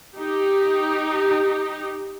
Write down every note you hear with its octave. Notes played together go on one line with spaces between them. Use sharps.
D#4 G4